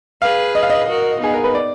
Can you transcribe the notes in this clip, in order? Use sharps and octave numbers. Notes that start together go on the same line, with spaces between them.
G#4 B4 F5
D#5
F5
D#5
F#4 A#4
B3 D#4 G#4
A#4
B4
D5